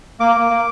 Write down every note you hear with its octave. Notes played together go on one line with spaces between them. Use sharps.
A#3 D6
A#3
A#3